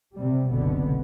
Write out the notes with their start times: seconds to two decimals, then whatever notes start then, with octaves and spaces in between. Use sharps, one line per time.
0.14 C3 G3
0.48 F#1 C2 B2 D3 B3